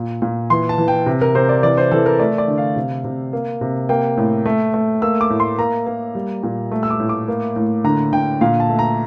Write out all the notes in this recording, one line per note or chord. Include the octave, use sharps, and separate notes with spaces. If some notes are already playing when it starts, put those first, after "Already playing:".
Already playing: A#2
A#2
E3 C6
A5
E3
G5
C3
A#4
C3 C5
D5
E3 D5
C5
E3 A4
A#4
A3 D5
D5
D3
F5
C3
C3
A#3
C3
A#3 G5
A2
A3
A3
A#3 E6
D6
A2
C6
A#3 A#5
A#3
G3
A#2
A3
E6
D6
A2
D6
A#3
A2
D3 A#5
D3 G5
A#2 F5
A5
A3
A#5